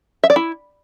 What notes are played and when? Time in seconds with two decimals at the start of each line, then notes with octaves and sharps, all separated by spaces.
0.24 E5
0.30 D5
0.36 E4